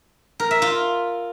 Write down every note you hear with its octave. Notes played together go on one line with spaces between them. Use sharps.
A#4
E5
F4